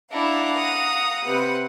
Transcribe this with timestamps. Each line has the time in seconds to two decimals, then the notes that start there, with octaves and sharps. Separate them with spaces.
0.12 D4 E4 F5 F#5 A#5
0.57 D#6
1.25 C3 B4 F#5